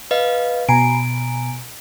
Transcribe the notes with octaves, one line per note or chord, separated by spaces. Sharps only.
B4 D#5 F5
B2 G#5 A#5 D7